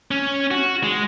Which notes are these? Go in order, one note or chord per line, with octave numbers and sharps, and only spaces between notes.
C#4
F#4
G#3